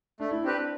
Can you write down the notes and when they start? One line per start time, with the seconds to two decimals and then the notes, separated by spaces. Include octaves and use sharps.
0.20 A3 D4
0.31 E4
0.43 C4 D4 G4 B4